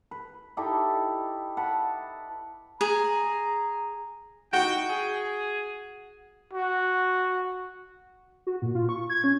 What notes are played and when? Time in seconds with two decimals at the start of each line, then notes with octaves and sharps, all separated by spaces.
0.11 B4
0.57 D#4 E4 G4 A4
1.57 F#5 A5 B5
2.81 G#4 A#5
4.53 D#4 E4 F#4 G5
4.90 G#4
6.53 F#4
8.47 F#4
8.62 A#2
8.75 F4
8.89 C#6
9.10 G#6
9.24 C#4